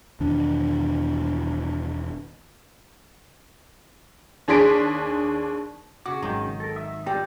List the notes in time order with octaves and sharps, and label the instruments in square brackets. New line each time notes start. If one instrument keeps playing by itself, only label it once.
[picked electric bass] E1 D#3 D4
[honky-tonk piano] D#2 D4 G#4 C6 B6 D7
[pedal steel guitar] C#3 D6 [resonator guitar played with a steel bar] F#4
[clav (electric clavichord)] G#1 F#3 G5 [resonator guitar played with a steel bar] D#3
[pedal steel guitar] A4 A#4
E5 D#6 E6
[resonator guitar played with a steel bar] G3 [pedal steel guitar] D#4 F4 [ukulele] G4